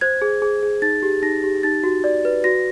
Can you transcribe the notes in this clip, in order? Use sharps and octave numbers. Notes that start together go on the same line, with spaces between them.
C5 G#6
G#4
G#4
G#4
D#4 A6
G4
D#4 A#6
G4
D#4 A6
F#4
D5
B4
F#4 A#6